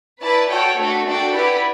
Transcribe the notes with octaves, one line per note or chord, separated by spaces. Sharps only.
E4 B4 D5 A5
F#4 A4 C#5 G5
A3 D4 F#4 A4
D4 F#4 A4 D5 G5
E4 G4 B4 D5 F#5